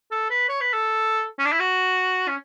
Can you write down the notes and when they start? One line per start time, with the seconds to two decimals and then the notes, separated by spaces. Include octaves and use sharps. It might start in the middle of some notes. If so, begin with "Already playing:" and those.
0.11 A4
0.30 B4
0.49 C#5
0.61 B4
0.73 A4
1.39 C#4
1.46 D4
1.52 E4
1.60 F#4
2.28 C#4